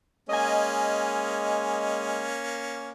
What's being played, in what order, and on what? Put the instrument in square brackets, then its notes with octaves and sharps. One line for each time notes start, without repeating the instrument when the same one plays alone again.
[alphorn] G#3 [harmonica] A#3 C#4 [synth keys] D#5 G#5